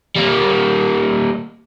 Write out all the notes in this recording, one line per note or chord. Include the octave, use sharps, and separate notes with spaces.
G3 A#3